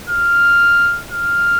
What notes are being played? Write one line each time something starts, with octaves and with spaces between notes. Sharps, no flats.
F6
F6